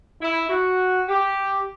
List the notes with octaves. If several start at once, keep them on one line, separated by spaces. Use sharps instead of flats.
E4
F#4
G4